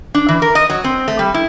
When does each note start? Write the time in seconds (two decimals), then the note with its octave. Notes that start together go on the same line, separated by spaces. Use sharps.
0.14 D4
0.29 E3
0.42 A#4
0.55 D#5
0.70 F#3
0.84 C4
1.08 A3
1.19 G3
1.34 E4